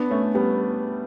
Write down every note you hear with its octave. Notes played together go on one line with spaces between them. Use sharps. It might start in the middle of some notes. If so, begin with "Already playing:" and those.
Already playing: B3 D4
A3 C#4
G3 B3